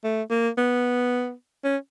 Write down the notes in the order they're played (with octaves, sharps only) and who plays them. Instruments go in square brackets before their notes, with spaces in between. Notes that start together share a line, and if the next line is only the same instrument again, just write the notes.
[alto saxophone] A3
A#3
B3
C#4